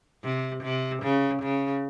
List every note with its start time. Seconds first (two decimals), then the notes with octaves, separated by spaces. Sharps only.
0.24 C3
0.64 C3
1.03 C#3
1.43 C#3